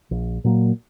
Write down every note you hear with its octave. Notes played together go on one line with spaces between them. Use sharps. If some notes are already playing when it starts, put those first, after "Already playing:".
A#1
A#2 F#3 A#3